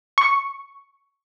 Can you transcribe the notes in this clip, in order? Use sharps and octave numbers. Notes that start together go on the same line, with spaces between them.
C#6